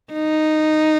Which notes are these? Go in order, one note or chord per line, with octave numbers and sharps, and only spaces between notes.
D#4